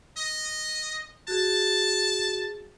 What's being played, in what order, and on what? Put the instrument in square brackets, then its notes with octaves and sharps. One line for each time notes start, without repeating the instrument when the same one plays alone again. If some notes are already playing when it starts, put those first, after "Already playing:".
[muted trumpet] D#5
[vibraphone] F#4 G#4 [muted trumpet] A5